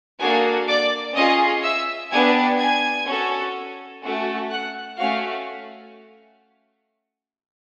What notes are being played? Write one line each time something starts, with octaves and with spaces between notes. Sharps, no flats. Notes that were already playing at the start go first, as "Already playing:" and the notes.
A#3 D4 F#4 G#4 A4 G#5
D5 D6
C#4 F4 G#4 D#5 D#6
E5 E6
B3 D4 G4 G#5 G#6
G#5 G#6
C#4 F#4 A4
A3 C#4 F#4 A4
F#5 F#6
A3 C#4 F#4 F5 F6